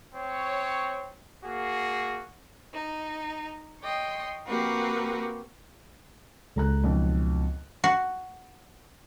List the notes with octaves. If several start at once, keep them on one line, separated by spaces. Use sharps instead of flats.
C4 C#5
A#3 F#4 G#4
D#4
C#5 D#5 G5 C6
A#3 C4 F#4 G4 A#4 B4
C#2 A4 A#5 F#6
B1 F2
F#4